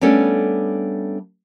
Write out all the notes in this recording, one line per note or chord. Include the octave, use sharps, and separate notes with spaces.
G3 A3 B3 C#4 D4 A4